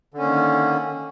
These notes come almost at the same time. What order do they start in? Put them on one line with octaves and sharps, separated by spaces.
D3 C#4 A#3 D#3